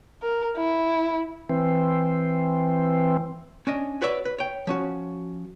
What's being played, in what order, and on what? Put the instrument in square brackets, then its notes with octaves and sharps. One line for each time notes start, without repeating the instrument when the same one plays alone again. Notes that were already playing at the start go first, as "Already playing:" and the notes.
[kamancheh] A#4
E4
[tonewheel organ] E3 C4
[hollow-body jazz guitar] C#4 D4 D#5
F#4 B4 C#5 D5 E5
B4
C#5 G5
F3 C#4 F#4